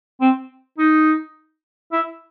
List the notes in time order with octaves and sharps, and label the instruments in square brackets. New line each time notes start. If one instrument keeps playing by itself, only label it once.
[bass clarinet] C4
D#4
E4